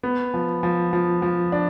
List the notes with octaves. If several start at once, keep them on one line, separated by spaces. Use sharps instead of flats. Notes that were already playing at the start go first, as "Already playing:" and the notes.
B3
F3
F3
F3
F3
D4